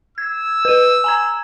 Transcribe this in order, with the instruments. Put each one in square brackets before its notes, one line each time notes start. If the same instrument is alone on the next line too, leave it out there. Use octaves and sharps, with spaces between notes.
[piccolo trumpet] E6 [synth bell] G#6
[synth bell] B4 D#7
G#5 A#5 G#6